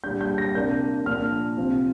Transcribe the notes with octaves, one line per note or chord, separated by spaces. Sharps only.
A#2 G3 D4 G6
G6
A#6
C3 A#3 D4 G6
A#2 F3 D4 F6
C3 F3 C4